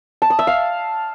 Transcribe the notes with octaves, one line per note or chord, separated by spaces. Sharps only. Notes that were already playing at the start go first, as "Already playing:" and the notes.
A5
D#6
E5
F5